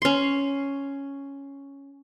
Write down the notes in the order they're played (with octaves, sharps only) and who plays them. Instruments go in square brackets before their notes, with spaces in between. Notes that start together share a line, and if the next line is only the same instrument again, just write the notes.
[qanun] C#4 C6